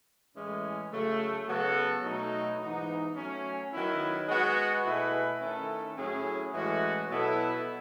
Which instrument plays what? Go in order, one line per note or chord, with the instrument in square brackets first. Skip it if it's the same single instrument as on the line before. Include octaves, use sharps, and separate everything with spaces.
[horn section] A2 E3 G#3 C#4
C#3 F#3 A3
C#3 F#3 B3 F#4 A4
B2 F#3 A3 D#4
G#2 E3 B3 D#4
F#3 A3 C#4
D#3 F#3 B3 E4
G#3 B3 F#4
B2 A3 E4 G#4 B4
D#3 A3 C#4 E4 A4
A2 F#3 C#4 E4 G#4
A2 E3 G#3 C#4 F#4
B2 F#3 B3 E4 A4